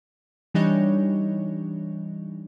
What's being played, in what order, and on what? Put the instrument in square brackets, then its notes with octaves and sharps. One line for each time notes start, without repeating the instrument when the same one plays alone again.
[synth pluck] E3 G3 D4 D#4 C#5